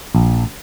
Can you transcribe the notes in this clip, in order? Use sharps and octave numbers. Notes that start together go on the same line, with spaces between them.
A#1